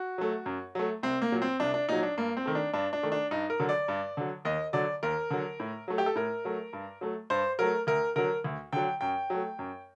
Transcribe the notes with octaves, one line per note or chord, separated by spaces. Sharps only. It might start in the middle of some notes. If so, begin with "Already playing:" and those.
Already playing: F#4
F#3 A3
F#2
F#3 A3
C2 C4
A#3
A#2 F#3
C4
C2 D4
D4
A#2 F#3 D#4
D4
G2 A#3
C4
D#3 A3
D4
G2 D4
D4
D#3 A3
D4
G2 D#4
A#4
D3 F#3
D5
G2
D3 F#3
D#2 D#5
D3 F#3 D5
D#2 A#4
D3 F#3
A2
F#3 A3
G4
A4
A2 A#4
F#3 A3
G2
F#3 A3
G2 C5
F#3 A3 A#4
D2 A#4
D3 F#3 A#4
D2
D3 F#3 G5
F#2 G5
F#3 A3
F#2